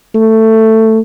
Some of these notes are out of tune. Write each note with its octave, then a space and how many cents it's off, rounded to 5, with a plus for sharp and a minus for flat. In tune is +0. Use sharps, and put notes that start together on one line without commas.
A3 +15